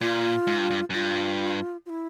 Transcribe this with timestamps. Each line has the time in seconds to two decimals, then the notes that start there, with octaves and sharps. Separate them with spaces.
0.01 A#2 F4
0.47 G#2
0.59 G2
0.70 G2
0.90 F#2
0.94 G2 F4
1.86 F4
1.90 E4